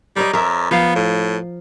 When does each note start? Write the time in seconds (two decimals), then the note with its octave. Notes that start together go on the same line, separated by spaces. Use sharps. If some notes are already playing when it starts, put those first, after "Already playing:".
0.16 G3 A#4 C#5 D#5
0.33 F2 A#4 E5
0.71 F3 B3 F5
0.95 A2